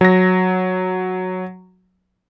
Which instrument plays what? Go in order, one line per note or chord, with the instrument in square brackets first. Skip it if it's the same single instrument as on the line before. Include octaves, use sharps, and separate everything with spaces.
[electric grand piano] F#3 A#6